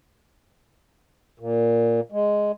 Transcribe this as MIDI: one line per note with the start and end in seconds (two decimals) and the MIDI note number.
1.39 2.00 46
2.12 2.52 56